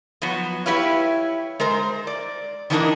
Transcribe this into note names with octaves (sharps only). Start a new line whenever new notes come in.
F3 F#3 B3 F#4
E4 G4 B4 C#5 F5
G#3 A#4 C5
D5
D#3 E3 A#3 D4 D#4 A#4